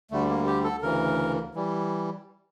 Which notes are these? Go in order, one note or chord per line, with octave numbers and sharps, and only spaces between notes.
D2 D3 G3 A3
A#3
G4
A4
D2 C#3 E3 A#4
E3 G3